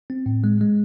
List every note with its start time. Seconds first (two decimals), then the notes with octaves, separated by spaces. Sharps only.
0.10 C4
0.26 A2
0.44 G#3
0.61 G#3